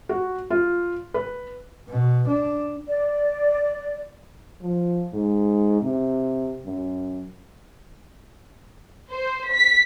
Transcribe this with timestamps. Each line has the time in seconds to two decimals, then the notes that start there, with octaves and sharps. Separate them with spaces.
0.09 F#4
0.50 F4
1.14 B4
1.89 B2
2.27 D4
2.87 D5
4.62 F3
5.14 G#2
5.82 C3
6.65 F#2
9.10 C5
9.52 B6